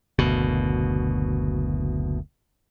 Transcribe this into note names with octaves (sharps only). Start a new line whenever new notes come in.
F#1 D2 B2